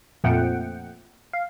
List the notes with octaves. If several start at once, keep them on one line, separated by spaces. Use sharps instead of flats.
F2 A#2 F3 A3 F#5 G5
F5